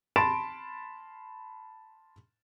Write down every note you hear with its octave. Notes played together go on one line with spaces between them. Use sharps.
A5 B5 C6 A6 D7 E7